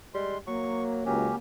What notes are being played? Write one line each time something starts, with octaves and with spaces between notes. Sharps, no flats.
G3 G#3 C6
F#3 A#3 C#6
C#2 F#3 C#4 G4